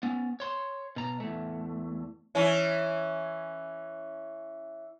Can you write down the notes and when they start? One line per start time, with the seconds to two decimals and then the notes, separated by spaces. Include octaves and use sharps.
0.03 B3 C#4
0.40 C#5 C6
0.96 B2 A#5
1.20 E2 A3
2.35 E3 C#4